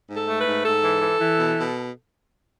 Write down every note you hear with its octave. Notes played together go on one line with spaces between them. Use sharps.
G#2
A4
A3
B4
G#2
G#2 A4
E3
E3
E3
B2
B2